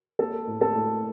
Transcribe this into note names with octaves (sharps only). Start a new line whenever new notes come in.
A#3 A4 A5
A2
A4 A5
A2